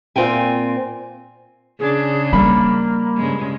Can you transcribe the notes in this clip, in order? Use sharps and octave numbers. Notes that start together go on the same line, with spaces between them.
A#2 C4 F4 G5 G#5
C#3 D4 G#4
G3 A#3 B5
G2 C#3 G#3